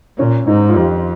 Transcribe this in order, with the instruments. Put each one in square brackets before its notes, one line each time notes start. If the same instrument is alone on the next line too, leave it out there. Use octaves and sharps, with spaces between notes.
[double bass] A#2 [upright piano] C#4
[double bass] G#2 [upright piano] D#4
[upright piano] F4
[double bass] F2 [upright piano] G4